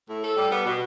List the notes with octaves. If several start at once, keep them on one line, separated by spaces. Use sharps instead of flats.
A2
A4
G3
B3
B2